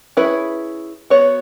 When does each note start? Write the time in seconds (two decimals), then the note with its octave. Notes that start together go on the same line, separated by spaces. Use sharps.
0.17 C#4 E4 G#4 B4
1.10 B3 F#4 C#5